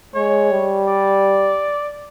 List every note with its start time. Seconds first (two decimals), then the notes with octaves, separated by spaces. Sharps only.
0.15 G#3 C#5
0.51 G3
0.88 D5